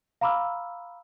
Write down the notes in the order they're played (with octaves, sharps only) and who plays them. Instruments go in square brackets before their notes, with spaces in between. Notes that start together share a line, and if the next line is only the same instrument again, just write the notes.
[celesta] F5 A#5 B5 D6 E6 F6